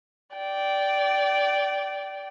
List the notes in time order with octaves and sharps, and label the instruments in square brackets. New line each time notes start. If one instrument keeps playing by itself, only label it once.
[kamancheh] D5 G5